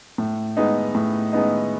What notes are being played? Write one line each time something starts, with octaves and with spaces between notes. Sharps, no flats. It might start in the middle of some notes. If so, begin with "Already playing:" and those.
A2
G#3 B3 D#4
A2
G#3 B3 D#4